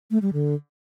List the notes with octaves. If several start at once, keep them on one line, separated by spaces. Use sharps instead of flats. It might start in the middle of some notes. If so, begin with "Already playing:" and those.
A3
G3
D3